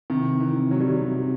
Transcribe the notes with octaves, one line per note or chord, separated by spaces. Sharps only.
C3 D#3
E3
C3
F#3
G3
F#3
C3